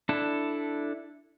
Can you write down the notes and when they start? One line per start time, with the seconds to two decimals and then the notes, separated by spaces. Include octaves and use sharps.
0.09 D4 E4 A4